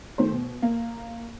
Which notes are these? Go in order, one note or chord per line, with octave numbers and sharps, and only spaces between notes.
D#3 A3 C5
B2
A#3